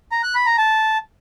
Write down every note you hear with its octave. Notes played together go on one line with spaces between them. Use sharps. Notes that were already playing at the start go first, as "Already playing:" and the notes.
A#5
F#6
B5
A#5
A5